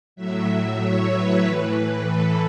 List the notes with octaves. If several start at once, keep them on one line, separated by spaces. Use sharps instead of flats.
A2 F#3 E5
C#5
B4
A2 E3 B4
A4